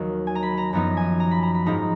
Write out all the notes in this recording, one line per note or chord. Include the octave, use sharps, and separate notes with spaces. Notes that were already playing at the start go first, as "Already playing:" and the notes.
Already playing: D#2 D#3 F#3
G#5
A#5
B5
A#5
F#2 F3 B3 D#4 A#5
G#5
A#5
B5
A#5
B5
G#2 F3 G#3 D#4 A#5